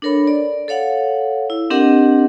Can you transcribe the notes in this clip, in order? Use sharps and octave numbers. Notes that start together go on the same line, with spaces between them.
D4 A4 A#4 C#5 B5
D5
A4 C#5 F5 F#5
E4
C4 D4 G4 A#4 D#5 F#5